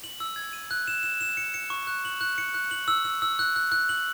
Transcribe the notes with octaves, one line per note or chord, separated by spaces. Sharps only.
F#7
E6
G#6
D#7
F#6
E7
E7
E7
C#7
C#7
C#6
F#6
F#7
F#6
C#7
F#6
F#7
E6
E6
E6
F#6
F#6
F#6
F#7